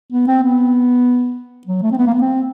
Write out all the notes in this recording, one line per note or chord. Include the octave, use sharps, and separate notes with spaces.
B3
C4
B3
F#3
A3
C4
B3
A#3
B3
C4